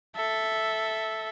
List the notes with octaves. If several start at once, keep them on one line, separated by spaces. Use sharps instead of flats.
A4 E5